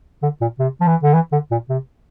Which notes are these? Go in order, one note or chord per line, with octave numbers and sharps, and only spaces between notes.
D3
A#2
C3
F3
E3
D3
E3
D3
A#2
C3